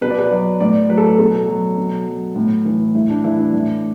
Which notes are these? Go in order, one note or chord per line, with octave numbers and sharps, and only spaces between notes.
B2 B4
D5
B4
F#3 D5
A2 D5
F#3 B4
A4
B4
B2 A4
F#3
B2
F#3
A2
E3
A2 E4
D4
E3 E4
D4
A2